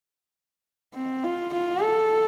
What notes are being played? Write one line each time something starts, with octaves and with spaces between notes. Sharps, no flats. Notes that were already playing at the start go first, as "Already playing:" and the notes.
C4
F4
F4
A4